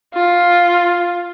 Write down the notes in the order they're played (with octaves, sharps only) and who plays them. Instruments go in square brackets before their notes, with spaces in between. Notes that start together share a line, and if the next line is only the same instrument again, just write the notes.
[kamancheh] F4